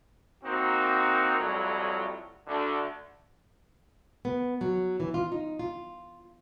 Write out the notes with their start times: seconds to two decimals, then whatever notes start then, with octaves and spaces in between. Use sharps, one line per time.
0.44 A#3 C4 D#4 F#4
1.38 F2 A2 F#3 G3
2.46 D2 D3
4.25 B3
4.61 F#3
5.00 E3
5.14 F4
5.32 D#4
5.59 F4